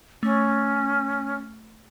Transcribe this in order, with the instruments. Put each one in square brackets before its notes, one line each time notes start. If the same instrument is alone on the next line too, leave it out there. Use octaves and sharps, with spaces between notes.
[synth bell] A3 [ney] C#4